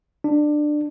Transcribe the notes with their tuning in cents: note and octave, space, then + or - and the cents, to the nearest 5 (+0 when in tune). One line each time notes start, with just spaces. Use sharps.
D4 +20